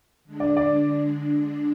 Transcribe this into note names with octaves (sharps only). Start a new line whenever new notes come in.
D3 G#3 D4
D5
D5